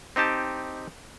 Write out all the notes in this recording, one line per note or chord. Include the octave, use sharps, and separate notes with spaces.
C4 D#4 G4 A5